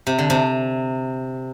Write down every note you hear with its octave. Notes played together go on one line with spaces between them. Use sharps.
C3
D3
C3